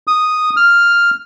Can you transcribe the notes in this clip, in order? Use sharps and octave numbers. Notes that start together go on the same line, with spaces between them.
D#6
F6